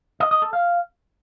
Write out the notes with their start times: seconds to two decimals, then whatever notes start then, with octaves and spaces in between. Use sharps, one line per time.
0.20 D#5
0.31 D#5
0.42 A4
0.53 F5